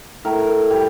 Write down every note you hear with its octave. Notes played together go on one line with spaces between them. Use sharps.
A2 A#4
G3